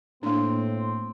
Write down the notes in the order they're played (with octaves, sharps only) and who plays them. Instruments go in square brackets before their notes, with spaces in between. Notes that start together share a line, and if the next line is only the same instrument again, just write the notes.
[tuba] A2 [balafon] A#3 D4 [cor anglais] C4